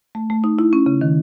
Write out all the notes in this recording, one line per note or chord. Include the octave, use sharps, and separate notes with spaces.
A3
A3
D#4
E4
C#4
C#3
D#3